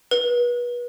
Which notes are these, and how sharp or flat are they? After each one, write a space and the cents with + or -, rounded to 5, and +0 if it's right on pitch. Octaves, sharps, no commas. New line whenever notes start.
B4 -30